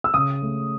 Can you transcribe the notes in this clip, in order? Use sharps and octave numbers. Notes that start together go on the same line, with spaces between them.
E6
C#3 D#6
A3